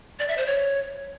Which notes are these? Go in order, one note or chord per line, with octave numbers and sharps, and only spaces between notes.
D5
E5
C5
C#5